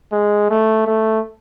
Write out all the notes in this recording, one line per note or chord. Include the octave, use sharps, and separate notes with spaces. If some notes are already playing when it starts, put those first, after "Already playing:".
G#3
A3
A3